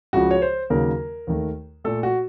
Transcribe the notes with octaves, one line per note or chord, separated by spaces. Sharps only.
C#2 C#3 F3 F#4
C#5
C5
D#2 C#3 F#3 A#3 A#4
D#2 D#3 A3
A#2 A3 A4
F#4